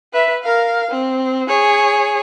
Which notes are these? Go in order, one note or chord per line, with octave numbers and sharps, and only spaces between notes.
B4 E5
A#4 F5
C4
G#4 C#5